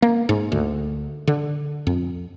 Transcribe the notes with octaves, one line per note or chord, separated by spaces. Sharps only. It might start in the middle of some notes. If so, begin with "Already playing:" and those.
A#3
G#2
D2
D3
F2